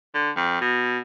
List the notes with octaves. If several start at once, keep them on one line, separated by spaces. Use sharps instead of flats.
D3
F2
B2